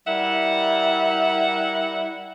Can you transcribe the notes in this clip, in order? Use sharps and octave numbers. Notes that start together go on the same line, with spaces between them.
G3 E4 A#4 E5 F#5